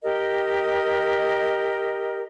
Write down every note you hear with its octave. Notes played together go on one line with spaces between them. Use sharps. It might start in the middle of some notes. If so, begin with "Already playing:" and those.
G4 A#4 D#5